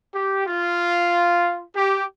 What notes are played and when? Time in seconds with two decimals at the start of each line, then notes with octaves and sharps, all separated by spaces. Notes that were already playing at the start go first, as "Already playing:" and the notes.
0.15 G4
0.47 F4
1.76 G4